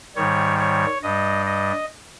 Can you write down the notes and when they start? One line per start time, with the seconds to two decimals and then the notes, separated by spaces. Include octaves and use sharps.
0.16 G#2 D#3 G3 C#5
0.59 C#5
1.02 G2 G3 D#5
1.46 D#5